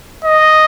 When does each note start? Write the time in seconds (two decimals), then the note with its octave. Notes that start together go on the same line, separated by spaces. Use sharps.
0.24 D#5